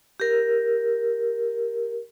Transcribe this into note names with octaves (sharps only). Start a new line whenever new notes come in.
G4 A#4